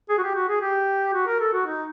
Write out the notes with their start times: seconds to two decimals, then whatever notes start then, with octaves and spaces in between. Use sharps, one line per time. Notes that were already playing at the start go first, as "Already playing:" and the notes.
0.09 G#4
0.18 F#4
0.23 G4
0.35 F#4
0.49 G#4
0.61 G4
1.14 F#4
1.27 A#4
1.40 A4
1.53 F#4
1.66 D#4